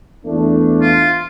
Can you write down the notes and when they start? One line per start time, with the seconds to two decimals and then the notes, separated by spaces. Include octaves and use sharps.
0.25 E2 A3 D4
0.82 F4